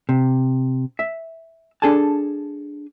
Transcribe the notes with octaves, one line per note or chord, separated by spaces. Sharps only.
C3
E5
D4 G#4 A4 G#5 A5